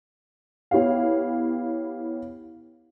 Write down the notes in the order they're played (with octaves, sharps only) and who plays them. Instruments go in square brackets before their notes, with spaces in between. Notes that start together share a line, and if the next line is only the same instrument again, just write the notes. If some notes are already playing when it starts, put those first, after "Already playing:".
[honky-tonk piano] B3 E4 G4 C#5 F5